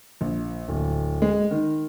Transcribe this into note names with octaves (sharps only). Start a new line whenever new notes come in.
A#1
D1
G#3
D#3